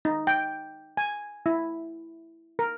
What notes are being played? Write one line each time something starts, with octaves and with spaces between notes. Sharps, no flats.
D#4
G5
G#5
E4
A#4